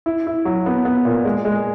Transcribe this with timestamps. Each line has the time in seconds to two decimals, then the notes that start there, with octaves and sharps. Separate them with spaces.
0.06 E4
0.27 E4
0.45 F#3
0.66 B3
0.85 B3
1.05 A#2
1.25 G#3
1.45 G#3